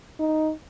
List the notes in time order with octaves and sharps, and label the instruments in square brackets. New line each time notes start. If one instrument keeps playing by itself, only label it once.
[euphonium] D#4